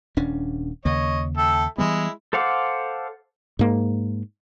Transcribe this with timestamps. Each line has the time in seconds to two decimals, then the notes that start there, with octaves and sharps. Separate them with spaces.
0.17 D#1 C#4 D4
0.85 D#2 C#3 A#3 C#5 D#5
1.37 A4 E5 G5
1.78 E3 G3 G#3 B3 E4
2.33 A4 C5 F5 F#5 D6
3.59 G#2 A#3